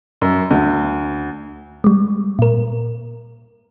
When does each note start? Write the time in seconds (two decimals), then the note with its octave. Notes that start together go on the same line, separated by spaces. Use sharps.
0.22 F#2
0.51 D2
1.84 G3 G#3
2.39 A#2 A#4